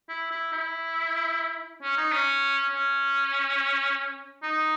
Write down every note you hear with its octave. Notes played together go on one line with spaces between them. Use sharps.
E4
E4
E4
C#4
D#4
C#4
C#4
D#4